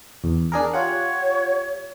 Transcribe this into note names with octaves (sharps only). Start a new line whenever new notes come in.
E2
D4 G#4 A#4
F4 G4 C#5 F#5